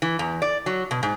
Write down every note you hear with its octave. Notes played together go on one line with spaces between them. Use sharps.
E3
E2
D5
F#3
B2
G#2